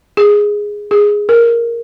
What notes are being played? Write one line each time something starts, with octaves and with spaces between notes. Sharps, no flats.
G#4
G#4
A#4